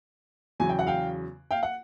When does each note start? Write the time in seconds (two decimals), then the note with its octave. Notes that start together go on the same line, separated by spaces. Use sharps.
0.60 E2 C#3 F#3 G#5
0.69 G5
0.79 F#5
0.87 F5 G5
1.51 F5 G5
1.63 F#5